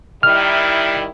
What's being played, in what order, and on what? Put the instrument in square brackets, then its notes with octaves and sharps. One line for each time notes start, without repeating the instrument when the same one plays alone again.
[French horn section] D#3 G3 E4 [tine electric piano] F6